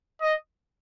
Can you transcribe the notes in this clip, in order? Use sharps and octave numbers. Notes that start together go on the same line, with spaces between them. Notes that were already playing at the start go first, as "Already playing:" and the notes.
D#5